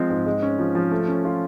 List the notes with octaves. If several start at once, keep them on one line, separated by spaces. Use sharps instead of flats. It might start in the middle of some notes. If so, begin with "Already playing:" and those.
Already playing: F3 G#3 C4
G#2
G#3
C#4
F3
F3
A3
C#4
F4